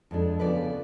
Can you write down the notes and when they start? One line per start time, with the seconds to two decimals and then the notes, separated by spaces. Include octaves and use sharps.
0.11 F2 F3 G#3 D4
0.39 D2 C#3 F3 B3 D4 B4 D5